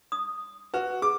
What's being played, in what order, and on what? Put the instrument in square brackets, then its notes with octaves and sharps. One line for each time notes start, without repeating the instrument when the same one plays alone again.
[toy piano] D#6
[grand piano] F#4 [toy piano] B4
[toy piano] G#4 [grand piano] D6